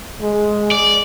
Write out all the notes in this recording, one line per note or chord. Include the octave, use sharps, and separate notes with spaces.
G#3
D5